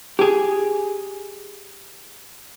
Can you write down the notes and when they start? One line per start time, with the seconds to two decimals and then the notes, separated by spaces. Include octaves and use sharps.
0.19 G4 G#4